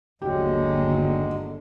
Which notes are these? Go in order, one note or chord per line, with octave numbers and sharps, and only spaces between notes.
G1 D#2 D3 F#3 G#3 F#4 G4